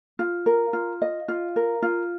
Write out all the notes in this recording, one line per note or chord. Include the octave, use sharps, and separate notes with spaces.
F4
A#4
F4
D#5
F4
A#4
F4